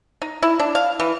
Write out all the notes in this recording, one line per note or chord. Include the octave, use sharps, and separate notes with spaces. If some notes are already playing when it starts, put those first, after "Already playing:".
D#4
E4
D4
F5
E3